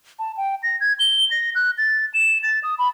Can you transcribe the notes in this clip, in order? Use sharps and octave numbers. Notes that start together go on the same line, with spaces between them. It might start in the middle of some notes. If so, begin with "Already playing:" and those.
A5
G5
A#6
G#6
G7
A#6
F#6
A6
E7
A6
D#6
B5